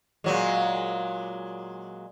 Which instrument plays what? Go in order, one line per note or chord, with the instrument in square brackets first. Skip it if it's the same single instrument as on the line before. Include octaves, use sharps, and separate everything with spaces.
[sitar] A#2 F#3 G#3